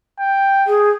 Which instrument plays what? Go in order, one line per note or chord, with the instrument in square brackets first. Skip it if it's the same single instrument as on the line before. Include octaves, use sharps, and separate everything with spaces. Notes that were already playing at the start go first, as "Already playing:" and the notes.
[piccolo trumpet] G5
[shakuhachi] G#4